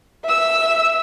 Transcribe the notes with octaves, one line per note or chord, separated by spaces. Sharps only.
E5 E6